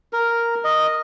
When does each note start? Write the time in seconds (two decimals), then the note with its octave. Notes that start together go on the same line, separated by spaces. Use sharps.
0.13 A#4
0.64 D#5